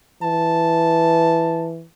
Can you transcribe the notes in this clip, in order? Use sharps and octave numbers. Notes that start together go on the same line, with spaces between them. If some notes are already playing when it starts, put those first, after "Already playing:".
E3 A5